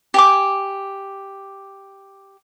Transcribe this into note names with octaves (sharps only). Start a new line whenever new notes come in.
G4 G#5 D6